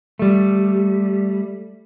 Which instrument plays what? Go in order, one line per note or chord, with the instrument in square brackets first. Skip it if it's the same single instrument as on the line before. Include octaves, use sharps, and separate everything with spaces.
[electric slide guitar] G3 A3